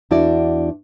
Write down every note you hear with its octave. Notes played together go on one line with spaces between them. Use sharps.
E2 D4 E4 F#4 D5